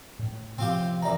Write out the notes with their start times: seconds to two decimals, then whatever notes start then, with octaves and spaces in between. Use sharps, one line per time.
0.19 A2
0.58 A2 C3 F3 C4 F4 G4
1.02 F#2 E3 D5 A#5